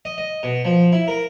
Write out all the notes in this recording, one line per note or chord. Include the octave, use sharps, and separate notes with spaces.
D#5
D#5
B2
F3
E4
A#4